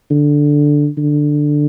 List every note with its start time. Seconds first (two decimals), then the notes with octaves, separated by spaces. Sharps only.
0.11 D3
0.98 D3